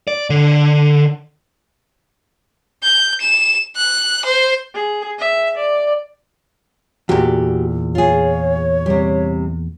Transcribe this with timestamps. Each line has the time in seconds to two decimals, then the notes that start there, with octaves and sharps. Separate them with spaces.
0.08 D5
0.30 D3
2.83 G6
3.21 E7
3.76 F#6
4.25 C5
4.74 G#4
5.19 E5
5.58 D5
7.09 E2 A#2 F#4 G4
7.95 F4 G#4 C#5
8.86 C3 G3